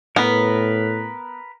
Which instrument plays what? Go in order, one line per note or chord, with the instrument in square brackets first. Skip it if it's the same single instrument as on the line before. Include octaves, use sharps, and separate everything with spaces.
[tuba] A2 [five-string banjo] B3 [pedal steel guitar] A#4 B4